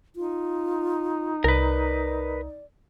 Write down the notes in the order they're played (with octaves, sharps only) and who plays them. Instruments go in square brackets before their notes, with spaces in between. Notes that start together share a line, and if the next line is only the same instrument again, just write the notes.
[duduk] D#4 [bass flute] F4
[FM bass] C2 [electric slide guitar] A#4 B4 [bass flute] D5